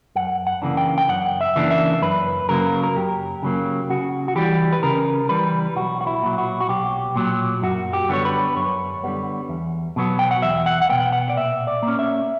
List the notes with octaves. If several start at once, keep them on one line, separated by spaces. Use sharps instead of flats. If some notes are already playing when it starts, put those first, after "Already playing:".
F#2 F#5
F#5
C#3 E3 A#3 D4
G5
G5
F#2 F#5
E5
C#3 E3 A#3 D4
E5
F#2 B4
C#3 F#3 A#3 A#4
A#4
F#2 G4
C#3 F#3 A#3
C#3 F#4
F#4
E3 G3 G4
B4
C#3 A#4
E3 G3 B4
B1 F#4
F#4
E4
A#2 F#3
F#4
F#4
B1 G4
A#2 F#3
F#2 F#4
G4
D3 G3 B3 C#5
B4
F#2 C#5
D3 G3 B3
E2
B2 F#3 B3
G5
F#5
E2 E5
F#5
F#5
B2 F#3 B3 G5
F#5
D5
A#2 E5
D5
A#3
C#4
E5